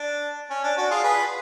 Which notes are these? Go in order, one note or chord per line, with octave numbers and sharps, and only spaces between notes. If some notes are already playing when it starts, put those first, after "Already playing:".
Already playing: D4
C#4
D4
D4 F#4
F4 G#4
G#4 B4